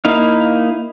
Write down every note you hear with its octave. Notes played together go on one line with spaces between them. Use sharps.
A#3 D#4 E4 F5